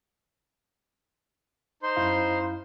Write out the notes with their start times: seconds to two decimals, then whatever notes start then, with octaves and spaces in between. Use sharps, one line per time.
1.83 D#4 C5 C6
1.96 F#2 E4 F5